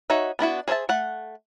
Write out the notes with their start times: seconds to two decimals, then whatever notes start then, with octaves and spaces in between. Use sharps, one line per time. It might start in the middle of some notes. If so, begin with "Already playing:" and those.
0.10 D#4 F#4 C#5 E5
0.39 B3 D4 E4 F#4
0.68 G#4 C5 C#5 E5 A5
0.89 A3 F#5